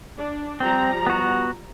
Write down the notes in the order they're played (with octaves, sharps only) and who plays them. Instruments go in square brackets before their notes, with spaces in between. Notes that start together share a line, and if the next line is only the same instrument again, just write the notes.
[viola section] D4
[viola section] F3 G3 A#5 [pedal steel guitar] C4
[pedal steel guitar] B3 F#4